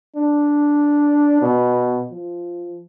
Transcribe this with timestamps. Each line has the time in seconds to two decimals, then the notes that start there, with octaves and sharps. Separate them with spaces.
0.16 D4
1.42 B2
2.11 F3